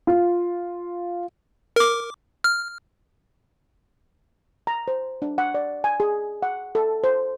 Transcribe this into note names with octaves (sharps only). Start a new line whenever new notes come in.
F4
A#4 D6
F6
A#5
C5
D4
F#5
D5
G#5
G#4
F#5
A4
C5